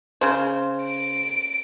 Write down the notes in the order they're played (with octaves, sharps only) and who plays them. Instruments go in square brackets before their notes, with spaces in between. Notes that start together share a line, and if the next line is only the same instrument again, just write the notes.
[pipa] C#3 C5
[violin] D7